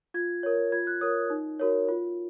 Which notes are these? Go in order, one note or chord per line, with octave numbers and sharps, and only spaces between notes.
F4 G#6
A#4 C#5
F4 G#6
F#6
A#4 C#5 D#6
D#4
F#4 A#4 C#5
F4